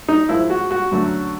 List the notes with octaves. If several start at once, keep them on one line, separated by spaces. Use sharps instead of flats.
D#4
G#2 F3 G#3 E4
F#4
F#4
F#2 D3 F#3 A3